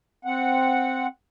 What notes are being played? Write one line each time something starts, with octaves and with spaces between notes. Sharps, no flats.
C4 F#5